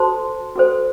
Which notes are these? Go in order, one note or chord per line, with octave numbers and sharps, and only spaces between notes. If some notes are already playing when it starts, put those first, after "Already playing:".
Already playing: F#4 A4 C5 A5 C6
F#4 A4 C5